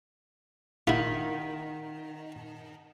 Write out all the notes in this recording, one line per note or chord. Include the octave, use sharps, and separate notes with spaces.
D#3 E4 F4 F#5 B6